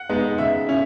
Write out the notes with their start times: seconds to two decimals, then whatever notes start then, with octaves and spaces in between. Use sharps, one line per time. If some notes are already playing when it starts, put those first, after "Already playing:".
Already playing: F#5
0.09 G#3 B3 D#4
0.38 C#3 E5
0.67 C#4 E4